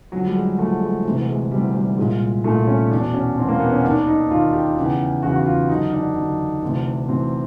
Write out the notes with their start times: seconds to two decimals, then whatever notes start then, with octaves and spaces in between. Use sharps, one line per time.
0.12 F2 D3 F#3
0.26 G3
0.35 G#3
0.58 F2 D3 A3
0.81 G#3
1.05 D2 C3 E3
1.29 G#3
1.52 D2 C3 E3 G3
1.75 G3
1.97 C2 A#2 G#3
2.44 C2 A#2 A3
2.68 C#4
2.91 E2 B2 D4
3.14 C#4
3.37 E2 B2 C4
3.48 A#3
3.60 B3
3.72 C#4
3.83 D#2 D#3 D4
4.07 D#4
4.31 D#2 D#3 F4
4.53 G4
4.76 E2 C#3 E3
5.23 E2 C#3 E3 F#4
5.36 F#4
5.46 F4
5.69 F#2 D3 D#4
5.93 D4
6.15 F#2 D3
6.62 D2 C3 E3
7.09 D2 C3 E3 C4